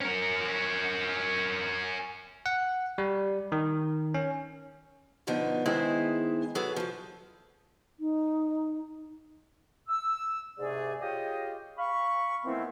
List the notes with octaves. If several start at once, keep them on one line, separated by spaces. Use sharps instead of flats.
C#4 A#4
F#5
G3
D#3
C#4
B2 D3 F3 B3 D#4
D#3 G#3 B3 E4 G#4 C5
F#3 G#4 A4 B4
F#2 F3
D#4
E6
C2 G#2 C3 A3 G#4 D5
F4 G4 G#4 C#5 D#5
F5 B5 C#6
D#3 E3 A3 B3 C4 E4